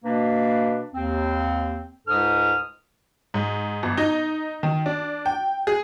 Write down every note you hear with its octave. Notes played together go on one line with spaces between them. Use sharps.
B2 A#3 D4 B4
D#2 C4
C#2 G#2 G#3 A4 D#6 F6
G#2
G1
D#4
D#3
D4
G5
G#4